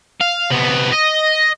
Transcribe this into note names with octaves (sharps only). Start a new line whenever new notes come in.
F5
C3 B3
D#5